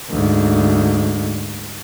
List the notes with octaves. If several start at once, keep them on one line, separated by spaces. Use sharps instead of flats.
D2 G#2